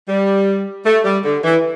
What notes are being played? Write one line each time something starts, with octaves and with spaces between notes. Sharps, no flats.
G3
A3
G3
D3
E3